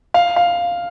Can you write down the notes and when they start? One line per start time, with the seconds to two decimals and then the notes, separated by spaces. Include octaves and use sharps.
0.14 F5
0.36 F5